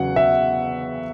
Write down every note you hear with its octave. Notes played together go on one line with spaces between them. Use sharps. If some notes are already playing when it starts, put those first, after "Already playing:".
Already playing: E2 C#3 F#3 F#5
E5